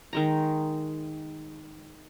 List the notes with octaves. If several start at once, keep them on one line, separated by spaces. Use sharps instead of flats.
D#3 G#3 A#5